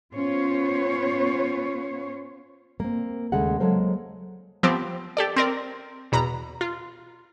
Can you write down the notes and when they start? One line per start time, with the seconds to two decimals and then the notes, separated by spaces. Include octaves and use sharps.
0.14 B3 C#4 F4 C5 C#5
2.80 A#3 C4
3.32 D#2 C#3 G#3 A3 F#5
3.60 F#3 G#3 A#3 A4 A#4 C5
4.63 F3 B3 C4 G4
5.17 G4 A4 D5
5.36 C4 A#4 D5
6.12 E2 B2 A#5 B5
6.61 F4